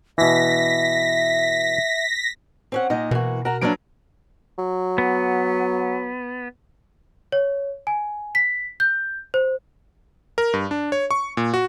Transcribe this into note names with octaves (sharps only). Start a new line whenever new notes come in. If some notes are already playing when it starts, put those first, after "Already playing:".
B2 E3 E5 A#6 B6
C4 C#4 F#5
A#2 D#4 D#5
B2 E3 A#3 F#4
F#4 A#4 A#5
F#3 A#3 C#4 D4 B4 D7
F#3
B3
C#5
G#5
B6
G6
C5
A#4
G2
D4
C#5
C#6
A#2
F#4